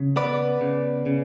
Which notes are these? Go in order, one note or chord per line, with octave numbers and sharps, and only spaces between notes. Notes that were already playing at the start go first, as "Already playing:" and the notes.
Already playing: C#3
B3 B4 D5
C#3
C#3